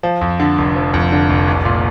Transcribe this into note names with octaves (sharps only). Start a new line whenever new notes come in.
F3
F2
D3
F1
F3
F2
D3
F1
C2
A#2